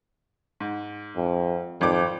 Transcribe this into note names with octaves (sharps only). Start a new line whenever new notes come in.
G#2
F2
G#1 F2 D6